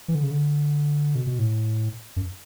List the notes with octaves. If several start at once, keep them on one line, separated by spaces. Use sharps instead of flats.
E3
D3
C#3
D3
B2
B2
A2
F#2